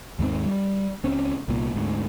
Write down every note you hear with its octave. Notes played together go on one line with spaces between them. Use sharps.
D#2 G#2 D#3 C4
G3
C#2 C4 C#4
C2 A#2
D2 G#2